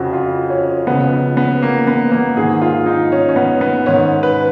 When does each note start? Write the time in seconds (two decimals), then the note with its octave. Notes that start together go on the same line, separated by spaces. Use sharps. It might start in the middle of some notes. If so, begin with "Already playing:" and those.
Already playing: F2 C#3 F3 F#4
0.13 F4
0.50 C#4
0.87 C#2 C#3 F3 B3
1.37 B3
1.62 A#3
1.87 B3
2.12 A#3
2.37 G#2 D#3 G#4
2.62 F4
2.86 D#4
3.12 C#4
3.29 C#4
3.36 B3
3.61 B3
3.86 G#2 D#3 C#4
4.23 B4